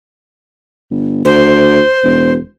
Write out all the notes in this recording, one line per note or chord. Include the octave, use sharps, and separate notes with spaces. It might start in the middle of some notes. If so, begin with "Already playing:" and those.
G1
D2 C5
E1